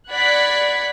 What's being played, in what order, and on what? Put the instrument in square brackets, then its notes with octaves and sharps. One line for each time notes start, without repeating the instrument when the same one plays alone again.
[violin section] D5 F#5 B5 F#6 G#6 B6